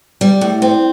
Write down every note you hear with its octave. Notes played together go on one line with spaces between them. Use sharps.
G3
A2
C4